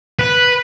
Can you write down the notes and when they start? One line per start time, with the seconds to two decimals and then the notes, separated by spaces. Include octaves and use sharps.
0.19 B4